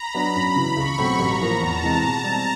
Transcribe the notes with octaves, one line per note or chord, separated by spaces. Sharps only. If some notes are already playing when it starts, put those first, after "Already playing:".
Already playing: A#5 B5
F#3 B3 D4
F#2 B5
C#3 E3
C#2 C#6
B2 F#3 A3 C4
A1 A#5
A2 F3 A#3
E2 A5
C3 E3 G#3
B2
G3 C4